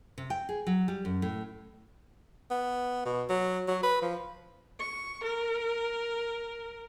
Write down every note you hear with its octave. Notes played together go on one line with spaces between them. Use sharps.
C3
G5
G#4
F#3
G3
F#2
A2
B3
B2
F#3
F#3
B4
F3
C#6
A#4